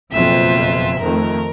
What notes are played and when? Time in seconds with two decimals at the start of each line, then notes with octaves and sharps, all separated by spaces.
0.12 F#1 F2 B2 F4 E5
0.99 F2 D#3 A3 A#4